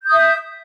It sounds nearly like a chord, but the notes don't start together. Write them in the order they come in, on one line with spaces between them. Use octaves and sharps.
G6 D#6 E5